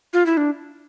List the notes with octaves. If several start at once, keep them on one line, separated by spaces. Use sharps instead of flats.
F4
E4
D4